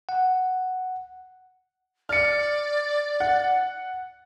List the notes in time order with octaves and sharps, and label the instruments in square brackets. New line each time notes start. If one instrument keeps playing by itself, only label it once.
[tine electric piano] F#5
[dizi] D5 [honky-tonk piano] F6 C#7
[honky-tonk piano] F#5